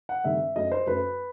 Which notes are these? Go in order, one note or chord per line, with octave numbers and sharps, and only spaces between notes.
F#5
G2 D#3 A3 C4 E5
F#2 F#3 A3 D#5
C5
F#2 F#3 A3 B4